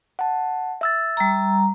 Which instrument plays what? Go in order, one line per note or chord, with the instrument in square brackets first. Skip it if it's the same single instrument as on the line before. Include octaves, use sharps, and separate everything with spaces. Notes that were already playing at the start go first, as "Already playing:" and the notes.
[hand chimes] F#5 A5
E5 E6 A6
[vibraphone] G3 A#5